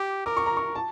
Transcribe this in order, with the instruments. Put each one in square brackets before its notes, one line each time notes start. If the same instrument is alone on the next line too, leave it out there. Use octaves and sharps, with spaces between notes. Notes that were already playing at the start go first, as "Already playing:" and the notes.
Already playing: [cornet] G4 [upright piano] D6
[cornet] A#4 [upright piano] D6
[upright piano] C#6
A#5
C#6
A5